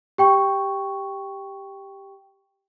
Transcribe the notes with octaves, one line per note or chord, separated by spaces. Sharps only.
G4 G5 C#6